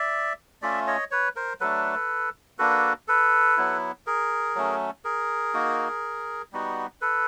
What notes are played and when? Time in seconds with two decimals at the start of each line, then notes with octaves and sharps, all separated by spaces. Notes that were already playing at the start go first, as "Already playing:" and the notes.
Already playing: D5 E5
0.62 A3 C#4 F4 D5 E5
0.87 C#5 D#5
1.11 B4 C#5
1.36 A#4 C5
1.60 F#3 A3 D4 A4 B4
2.58 A#3 D4 F#4 A4 B4
3.08 A4 B4
3.57 F#3 B3 E4
4.07 G#4 A#4
4.55 F#3 A3 C#4
5.05 G#4 A#4
5.54 A#3 D#4 F#4
6.52 G3 B3 D#4 F#4
7.01 A4 B4